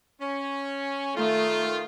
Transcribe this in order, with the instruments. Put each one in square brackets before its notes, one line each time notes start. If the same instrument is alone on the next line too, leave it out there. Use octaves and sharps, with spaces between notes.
[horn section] C#4
[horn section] D#3 F4 [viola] A3